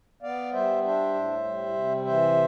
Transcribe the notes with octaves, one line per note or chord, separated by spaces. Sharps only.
B3 D5 F5
G3 C5 E5
D4 C5 E5
A2
G3
C3
E3 C5 E5